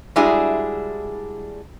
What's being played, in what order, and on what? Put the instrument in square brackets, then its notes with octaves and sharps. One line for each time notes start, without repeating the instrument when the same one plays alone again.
[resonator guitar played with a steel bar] G3 G#3 D4 E4 F#4 G#4